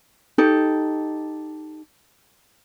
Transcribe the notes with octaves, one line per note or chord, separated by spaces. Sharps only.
D#4 G4 A4